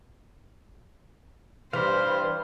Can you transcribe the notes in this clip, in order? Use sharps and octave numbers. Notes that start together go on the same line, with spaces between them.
G2 E3 C5 F5 B5